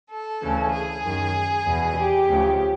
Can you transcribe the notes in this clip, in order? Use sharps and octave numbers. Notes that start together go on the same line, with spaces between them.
A4
D2 C#3 E3
G#4
F#2 D#3
E2 B2
G4
D2 C#3 F3